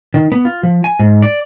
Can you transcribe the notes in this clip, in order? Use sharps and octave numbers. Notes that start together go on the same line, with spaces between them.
D#3
B3
F4
F3
G#5
G#2
D5